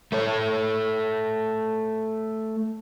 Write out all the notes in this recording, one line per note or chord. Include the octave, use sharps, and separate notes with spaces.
A3 A4 C#5